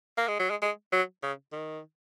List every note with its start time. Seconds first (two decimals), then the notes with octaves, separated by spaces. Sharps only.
0.17 A#3
0.28 G#3
0.39 F#3
0.50 G#3
0.62 G#3
0.92 F#3
1.23 C#3
1.52 D#3